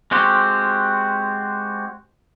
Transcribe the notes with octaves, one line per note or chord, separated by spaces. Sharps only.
G#3 C4 F#4 G4